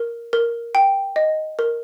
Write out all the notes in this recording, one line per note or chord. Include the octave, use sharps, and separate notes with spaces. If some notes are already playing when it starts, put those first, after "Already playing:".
Already playing: A#4
A#4
G5
D#5
A#4